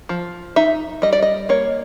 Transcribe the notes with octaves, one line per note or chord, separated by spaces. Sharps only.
F3
D#4 E5
G3 D#5
D5
D#5
A#3 C#5